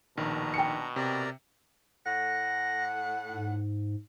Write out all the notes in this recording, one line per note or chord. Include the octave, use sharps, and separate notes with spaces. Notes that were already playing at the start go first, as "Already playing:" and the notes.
A#1 B2 D#3 D4 A#5
G5 C#7
C3 A#4 D5 A#5
A2 F#5 A#6
G#2